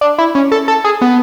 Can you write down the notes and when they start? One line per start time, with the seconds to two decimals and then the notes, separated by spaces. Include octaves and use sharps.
0.01 D4
0.18 E4
0.35 C#4
0.52 A4
0.68 A4
0.84 G#4
1.02 B3